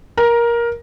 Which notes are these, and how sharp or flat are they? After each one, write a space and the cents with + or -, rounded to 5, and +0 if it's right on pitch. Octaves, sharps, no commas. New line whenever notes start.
A#4 +15